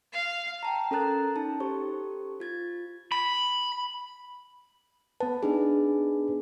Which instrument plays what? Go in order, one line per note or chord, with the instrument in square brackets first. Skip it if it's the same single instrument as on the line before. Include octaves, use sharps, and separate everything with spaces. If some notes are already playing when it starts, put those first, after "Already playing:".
[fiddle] F5
[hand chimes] G5 A5 A#5
C#4 A4 A#4 A#5 F#6 A6
C#4 D#4 A5
G4 A4 C5 C#6
F4 G#6 A6
[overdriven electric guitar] B5
[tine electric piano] B3 B4 [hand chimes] A5
[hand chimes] D4 D#4 G#4